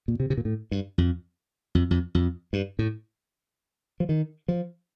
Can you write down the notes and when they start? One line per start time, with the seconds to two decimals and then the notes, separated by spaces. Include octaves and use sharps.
0.08 A#2
0.20 C3
0.30 C3
0.37 A#2
0.45 A2
0.71 G2
0.98 F2
1.75 F2
1.91 F2
2.15 F2
2.53 G2
2.79 A2
4.00 F3
4.09 D#3
4.48 F3